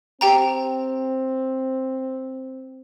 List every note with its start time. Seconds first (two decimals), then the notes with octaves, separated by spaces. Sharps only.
0.21 C4 G4 G5 A#5